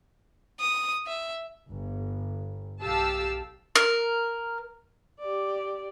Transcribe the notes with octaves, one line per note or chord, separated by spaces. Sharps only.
D#6
E5
G1
B1 G4 F5 A5 E6
A#4
G4 D5